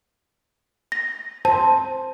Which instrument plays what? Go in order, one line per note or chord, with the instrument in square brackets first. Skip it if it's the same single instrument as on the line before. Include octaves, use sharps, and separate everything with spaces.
[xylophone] A#6
[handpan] C5 [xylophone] A5